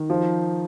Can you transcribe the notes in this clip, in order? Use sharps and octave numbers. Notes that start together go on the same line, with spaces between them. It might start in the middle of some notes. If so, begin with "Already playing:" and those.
Already playing: D#3
F3